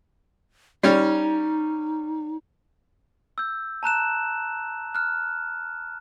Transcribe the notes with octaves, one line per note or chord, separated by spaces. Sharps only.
G3 C#4 D#4
E6 G6
A5 A#5 F#6 E7
F6 F#6